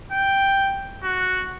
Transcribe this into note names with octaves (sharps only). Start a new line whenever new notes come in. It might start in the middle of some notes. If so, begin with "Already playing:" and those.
G5
F#4